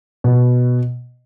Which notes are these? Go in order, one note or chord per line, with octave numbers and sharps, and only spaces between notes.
B2